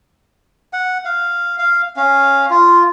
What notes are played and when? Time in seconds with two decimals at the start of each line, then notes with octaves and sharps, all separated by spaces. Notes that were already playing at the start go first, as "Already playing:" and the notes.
0.73 F#5
1.05 F5
1.59 F5
1.97 C#4 F5
2.50 F4